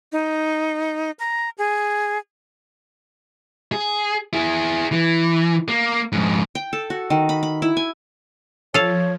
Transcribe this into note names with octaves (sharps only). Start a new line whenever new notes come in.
D#4
A#5
G#4
G#4
E4 G#4
E3
A#3
F2 G#2
G5
A4
F#4
D#3
B5
B5
E4
G#5
F3 A4 C#5 F5